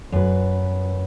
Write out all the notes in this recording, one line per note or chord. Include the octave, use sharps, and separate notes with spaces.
F#2 B4